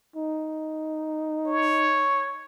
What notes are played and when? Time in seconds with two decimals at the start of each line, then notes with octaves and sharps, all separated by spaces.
0.16 D#4
1.47 C#5